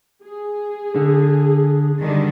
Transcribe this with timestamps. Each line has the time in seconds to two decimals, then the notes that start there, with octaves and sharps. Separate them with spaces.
0.23 G#4
0.96 D3
2.00 D3 D#3 G3